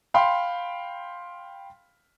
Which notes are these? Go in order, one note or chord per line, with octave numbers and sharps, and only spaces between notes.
F5 G5 B5 C6